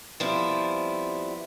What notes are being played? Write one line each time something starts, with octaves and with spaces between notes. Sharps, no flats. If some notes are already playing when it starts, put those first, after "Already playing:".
F3 G3 B3 C4 E4